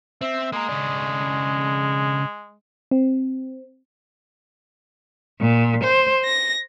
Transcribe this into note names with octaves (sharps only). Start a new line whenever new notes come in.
C4 E5
G#3 A#3 A#4
C#3 D4
C4
A#2
C5
A#6